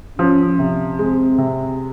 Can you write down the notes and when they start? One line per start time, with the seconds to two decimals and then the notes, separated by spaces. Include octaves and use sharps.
0.19 F3 C#4
0.59 C3
0.99 G#3 C4
1.38 C3